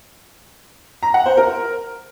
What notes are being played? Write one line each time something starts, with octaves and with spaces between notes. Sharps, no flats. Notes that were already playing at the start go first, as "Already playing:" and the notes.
A#5
F#5
C5
A#4